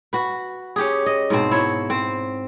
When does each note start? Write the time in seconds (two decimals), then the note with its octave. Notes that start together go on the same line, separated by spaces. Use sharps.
0.13 F#4 B4
0.76 C#4 G4 G#4
1.06 D#5
1.30 G#2 B2 C4
1.51 E4 C#5
1.90 C4